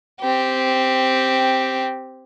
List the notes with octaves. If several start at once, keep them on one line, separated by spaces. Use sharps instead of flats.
C4 G4